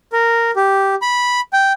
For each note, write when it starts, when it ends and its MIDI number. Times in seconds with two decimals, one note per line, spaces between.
0.12 0.51 70
0.56 0.95 67
1.02 1.40 83
1.53 1.73 79